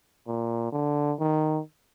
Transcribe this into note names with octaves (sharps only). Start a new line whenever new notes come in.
A#2
D3
D#3